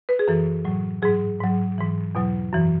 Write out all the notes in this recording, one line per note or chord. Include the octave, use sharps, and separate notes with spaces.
B4
G#4
F#2 E3 A4
A2 F#3
G#2 F#3 G#4
G#2 F#3
G#2 E3
E2 B2 F#3
F#2 E3